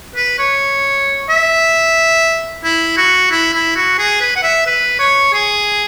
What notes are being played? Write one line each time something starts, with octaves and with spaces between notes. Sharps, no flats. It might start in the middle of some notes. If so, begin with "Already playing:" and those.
B4
C#5
E5
E4
F#4
E4
E4
F#4
G#4
B4
F#5
E5
B4
C#5
G#4